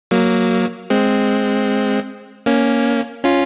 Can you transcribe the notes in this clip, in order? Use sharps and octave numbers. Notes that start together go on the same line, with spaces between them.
F#3 A#3
G#3 C4
A#3 C#4
C#4 F4